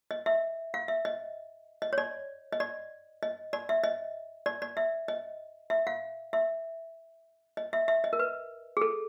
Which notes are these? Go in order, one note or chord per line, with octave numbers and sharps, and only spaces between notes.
D#5
E5
F5
E5
D#5
D#5
C#5
D5
D#5
D5
D#5
D5
E5
D#5
D5
D5
E5
D#5
E5
F5
E5
D#5
E5
E5
D#5
A#4
B4
G#4
A4